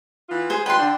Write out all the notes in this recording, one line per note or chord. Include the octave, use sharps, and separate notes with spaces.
E3 B3 F4
G#4 C5
F3 D4 B4 G5 C6
D3 D4